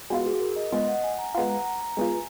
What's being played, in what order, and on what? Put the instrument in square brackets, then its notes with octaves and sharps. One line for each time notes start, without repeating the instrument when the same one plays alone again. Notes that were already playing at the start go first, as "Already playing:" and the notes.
[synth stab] G#3 B3 F4 [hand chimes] F#4
[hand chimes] G#4
A#4
D#5
[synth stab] G#3 B3 F4 [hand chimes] D#5
[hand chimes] F#5
G#5
A#5
[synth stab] G#3 B3 F4 [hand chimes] F#5
[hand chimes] A#5
A#5
A#5
[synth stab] G#3 B3 F4 [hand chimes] G#5